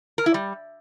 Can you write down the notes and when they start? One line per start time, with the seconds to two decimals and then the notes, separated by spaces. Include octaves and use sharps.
0.18 A#4
0.26 E4
0.34 G3